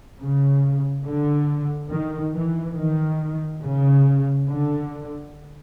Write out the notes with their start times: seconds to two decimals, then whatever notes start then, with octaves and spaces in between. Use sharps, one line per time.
0.19 C#3
1.05 D3
1.91 D#3
2.33 E3
2.76 D#3
3.62 C#3
4.48 D3